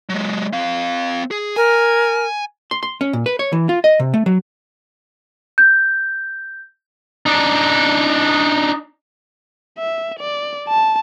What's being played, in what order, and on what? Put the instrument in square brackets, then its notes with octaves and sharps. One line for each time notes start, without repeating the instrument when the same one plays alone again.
[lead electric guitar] F#3 G#3
C4 F5
G#4
[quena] A#4 [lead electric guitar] G#5
[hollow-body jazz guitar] C6
C6
C#4
A#2
B4
C#5
E3
F4
D#5
C3
A3
F#3
[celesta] G6
[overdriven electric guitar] D4 D#4
[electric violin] E5
D5
A5